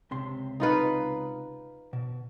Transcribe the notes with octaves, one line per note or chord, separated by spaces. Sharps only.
C#2 C3 C6
D#4 F4 B4
B2